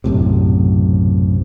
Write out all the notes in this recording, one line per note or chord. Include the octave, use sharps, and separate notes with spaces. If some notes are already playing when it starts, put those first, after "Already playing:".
B1 F#2 A2 C3